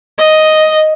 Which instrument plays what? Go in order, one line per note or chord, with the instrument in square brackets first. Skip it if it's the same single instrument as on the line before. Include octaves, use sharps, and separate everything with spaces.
[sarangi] D#5